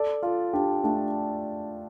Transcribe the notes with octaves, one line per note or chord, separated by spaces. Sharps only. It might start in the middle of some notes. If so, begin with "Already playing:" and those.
Already playing: A4 D5
F4 A4
D4 G4
A3 D4